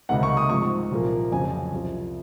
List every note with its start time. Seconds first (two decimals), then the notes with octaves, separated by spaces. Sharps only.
0.09 C#2 C3 D#3 F#5
0.23 C#6
0.37 D#6
0.50 G#2 F3 G#3 C4 C#6
0.91 C2 A#2 F3 A#3
1.32 F2 C#3 F#3 C4 G#5
1.73 C2 C3 F3